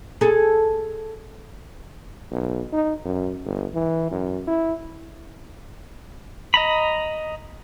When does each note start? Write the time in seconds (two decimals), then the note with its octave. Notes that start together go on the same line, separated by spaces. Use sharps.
0.21 G#4 A4
2.32 B1
2.73 D#4
3.05 F#2
3.45 G1
3.74 E3
4.11 F#2
4.48 E4
6.54 D#5 A#5 B5